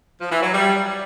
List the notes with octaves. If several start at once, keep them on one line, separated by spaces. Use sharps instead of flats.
F3
E3
F#3
G3